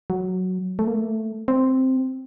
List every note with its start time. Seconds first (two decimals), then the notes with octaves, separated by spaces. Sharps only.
0.10 F#3
0.79 A3
0.87 A#3
0.95 A3
1.48 C4